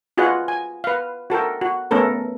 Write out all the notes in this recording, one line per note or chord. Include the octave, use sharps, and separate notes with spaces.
F4 F#4 G#4 B4 D#5 F#5
G#5
B4 F5
F#4 A4 A#4 G5
F#4
A3 B3 C#4 A4 A#4